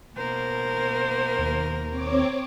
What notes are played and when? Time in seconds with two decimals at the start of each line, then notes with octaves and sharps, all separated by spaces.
0.16 B2 A#3 A#4 C5
1.39 D#2
1.90 C4 C#5 D6